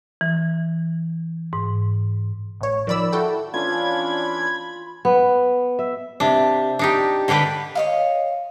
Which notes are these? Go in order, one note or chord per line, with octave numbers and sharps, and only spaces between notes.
E3
G#2
A1 C#5
D#3 F3 D5 B5 E6
E4 F#4 A4 G5
E3 C#4 D4 F4 B5 G#6
B3
E5
C3 D4
D4 D#4 G4
D3 G3 D4 G4 B4
C#5 D#5 F5